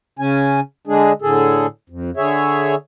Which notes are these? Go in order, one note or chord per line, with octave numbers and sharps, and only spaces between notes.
C#3 C#4 G#5
D3 G#3 D4 G#4
A2 D3 G#4 A4
F2
D3 G#4 C#5 E5